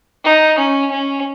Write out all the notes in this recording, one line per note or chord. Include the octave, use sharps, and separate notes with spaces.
D#4
C#4
C#4